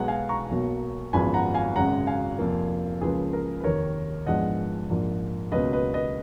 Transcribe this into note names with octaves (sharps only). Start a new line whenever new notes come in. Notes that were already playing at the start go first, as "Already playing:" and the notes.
Already playing: B1 B2 G#3 B3 F#5 A#5
F5 G#5
A#5 C#6
B1 B2 F#3 A#3
G#1 F#2 F3 G#3 B3 G#5 B5
F#5 A#5
F5 G#5
G#1 F#2 C#3 G#3 F#5 A#5
F5 G#5
F1 F2 F3 A#3
C#2 C#3 F3 A#3 G#4 B4
A#4
B4
F1 D#2 D#3 A#4 C#5
A#1 G#2 F3 G#3 B3 D#5 F#5
A#1 G#2 F3 A#3
C#2 B2 F#3 A#3 B4 D#5
B4 D#5
B4 D#5